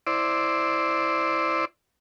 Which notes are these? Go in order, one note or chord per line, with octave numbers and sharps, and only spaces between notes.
E4 C5 D5